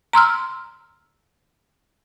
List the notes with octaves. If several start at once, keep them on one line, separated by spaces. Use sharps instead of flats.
A#5 C6 E6 F6